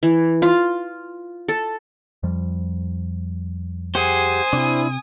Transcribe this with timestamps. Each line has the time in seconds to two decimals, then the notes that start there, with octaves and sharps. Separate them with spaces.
0.03 E3
0.42 F4
1.48 A4
2.23 F2 F3 G3
3.95 G4 G#4 C5 F#5 G#5 D#6
4.53 C3 C4 D4 E4